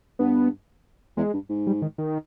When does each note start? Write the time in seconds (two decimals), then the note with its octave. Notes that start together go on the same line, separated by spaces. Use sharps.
0.19 G2 B3
1.17 E2 G#3
1.34 G2
1.49 G#2
1.67 G3
1.82 D#3
1.98 D#3